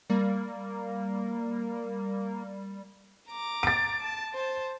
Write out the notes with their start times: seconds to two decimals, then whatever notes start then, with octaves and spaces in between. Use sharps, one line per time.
0.10 G3 A#3
3.30 A#5 D6
3.63 A6 D7
4.01 A5
4.33 C5 A5